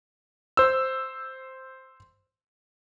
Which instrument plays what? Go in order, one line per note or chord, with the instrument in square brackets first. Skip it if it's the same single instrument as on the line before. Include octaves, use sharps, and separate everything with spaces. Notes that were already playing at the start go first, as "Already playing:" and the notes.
[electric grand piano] C5 E6